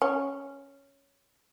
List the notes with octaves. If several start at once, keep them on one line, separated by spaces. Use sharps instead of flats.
C#4